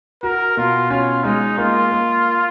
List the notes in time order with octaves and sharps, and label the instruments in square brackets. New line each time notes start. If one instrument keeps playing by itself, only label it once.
[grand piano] F#4 [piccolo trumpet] A#4
[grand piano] B2 [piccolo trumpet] F4
[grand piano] C#4 [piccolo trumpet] F4
[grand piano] G#3 [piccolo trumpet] D#4
[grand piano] A#3 [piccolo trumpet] F4
[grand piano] A#3